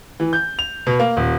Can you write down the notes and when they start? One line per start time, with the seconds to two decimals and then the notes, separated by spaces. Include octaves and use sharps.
0.20 E3
0.33 G6
0.59 F7
0.87 B2
1.00 A#3
1.17 D#1